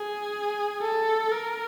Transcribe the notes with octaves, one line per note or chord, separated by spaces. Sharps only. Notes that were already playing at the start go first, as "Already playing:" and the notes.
Already playing: G#4
A4
A#4